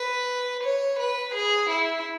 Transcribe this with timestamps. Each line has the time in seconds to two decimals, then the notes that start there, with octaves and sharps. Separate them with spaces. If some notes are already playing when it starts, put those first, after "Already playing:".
Already playing: B4
0.64 C#5
0.99 B4
1.34 G#4
1.70 E4